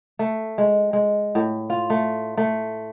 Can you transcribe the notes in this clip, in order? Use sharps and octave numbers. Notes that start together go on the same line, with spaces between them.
A3
G#3
G#3
A2
F4
A3
A3